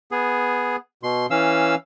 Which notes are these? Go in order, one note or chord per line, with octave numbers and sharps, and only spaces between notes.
B3 G#4
B2 C6
E3 C#4 F5 E6